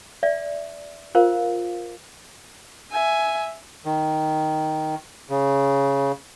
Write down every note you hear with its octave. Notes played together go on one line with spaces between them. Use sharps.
D5 E5
F4 A#4 C5 F5
E5 G#5
D#3
C#3